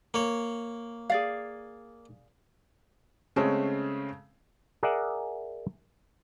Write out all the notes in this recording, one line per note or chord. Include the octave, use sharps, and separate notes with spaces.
A#3 C#5
G#4 D5 F5
C#3 G#3 A3 C4 C#4
G#4 A#4 D5 E5 F#5